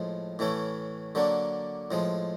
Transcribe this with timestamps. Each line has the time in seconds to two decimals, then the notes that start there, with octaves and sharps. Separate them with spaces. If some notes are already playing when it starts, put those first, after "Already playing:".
Already playing: A2 F3 G#3
0.39 A2 E3 A3 C#4
1.15 D3 F#3 A#3 D4
1.91 A2 F3 G#3